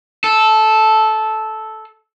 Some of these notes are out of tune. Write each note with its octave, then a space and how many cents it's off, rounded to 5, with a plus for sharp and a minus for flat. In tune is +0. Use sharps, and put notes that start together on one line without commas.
A4 -10